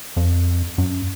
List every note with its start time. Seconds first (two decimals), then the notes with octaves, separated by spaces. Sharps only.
0.17 F2
0.78 F#2